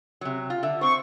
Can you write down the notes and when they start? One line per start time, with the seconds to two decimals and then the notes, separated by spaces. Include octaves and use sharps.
0.21 C3 F#3
0.50 F4
0.63 D3 E5
0.81 C4 C5 C#6